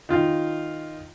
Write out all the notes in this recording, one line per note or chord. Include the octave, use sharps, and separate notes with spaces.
D#3 F4